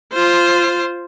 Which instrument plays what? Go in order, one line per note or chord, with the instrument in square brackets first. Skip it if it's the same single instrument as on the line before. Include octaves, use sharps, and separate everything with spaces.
[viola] F4 C5